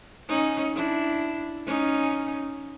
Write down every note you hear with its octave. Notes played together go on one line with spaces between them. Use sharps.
C#4 D#4
D4 E4
C#4 D#4